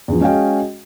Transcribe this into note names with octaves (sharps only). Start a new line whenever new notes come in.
E2 F3
G#3 C#4 F#4 D#5 F5 G5